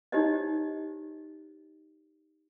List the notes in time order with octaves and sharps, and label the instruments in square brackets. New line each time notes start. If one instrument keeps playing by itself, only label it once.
[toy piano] D#4 E4 G4 C5 C#5 D#5